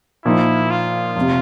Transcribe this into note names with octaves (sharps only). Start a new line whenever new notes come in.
A#2 F3 A#3 D#4 E4
F4
F1
C3